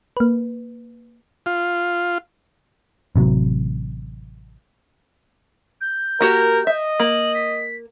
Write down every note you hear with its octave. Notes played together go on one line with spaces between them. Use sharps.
A#3 B4
F4
A1 C3 F#3
G6
A#3 F#4 G4 A#4
D#5 E5
A#3 F#7
B6